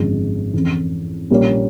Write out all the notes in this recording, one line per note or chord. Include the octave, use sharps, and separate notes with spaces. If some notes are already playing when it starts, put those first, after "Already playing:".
Already playing: G#1 F#2 D3 F3 G#3
F2 C#3 E3
A#1 A#2 G3 A#3 C#4